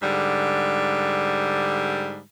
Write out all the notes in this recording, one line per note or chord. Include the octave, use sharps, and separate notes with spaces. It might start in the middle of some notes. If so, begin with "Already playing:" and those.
G#2 D3 G3